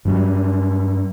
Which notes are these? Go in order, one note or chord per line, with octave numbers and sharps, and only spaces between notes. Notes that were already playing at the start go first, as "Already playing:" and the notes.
G2 F#3 G3